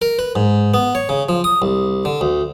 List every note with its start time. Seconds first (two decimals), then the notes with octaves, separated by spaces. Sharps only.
0.02 A#4
0.19 B4
0.36 G#2
0.74 B3
0.95 C#5
1.09 C#3
1.29 F3
1.44 D#6
1.62 C2
2.05 D3
2.21 D2